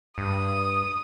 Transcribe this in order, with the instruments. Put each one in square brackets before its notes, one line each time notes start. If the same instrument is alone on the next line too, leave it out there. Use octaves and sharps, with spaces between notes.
[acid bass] G2 [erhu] D#6